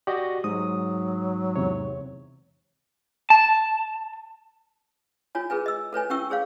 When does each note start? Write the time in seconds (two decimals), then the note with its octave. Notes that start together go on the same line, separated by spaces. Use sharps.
0.07 F#4 G4 D5 D#5
0.44 G#2 F#3 D#6
1.56 E2 C3 C#5
3.30 A5
5.35 F4 C#5 G#5
5.50 G#4 A#4 B4 G#5
5.66 D#5 E6
5.93 A4 B4 C#5 G#5
6.10 C#4 G4 A#4 G5 C#6 E6
6.30 G#4 C5 C#5 F5